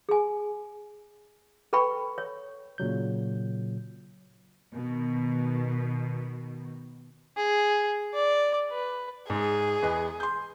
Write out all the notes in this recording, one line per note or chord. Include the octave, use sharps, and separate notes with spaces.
G#4 G#5
A4 B4 G5 B5 C#6
C#5
A#2 C#3 F#3 G6
B2 D#3
G#4
D5
B4
G#2 G#4
E2 B4 D#5
C6 G6